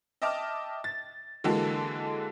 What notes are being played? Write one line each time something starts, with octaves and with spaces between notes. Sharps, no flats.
D#5 E5 G5 A5 D6 F6
A6
D3 E3 G#3 A#3 F#4 A4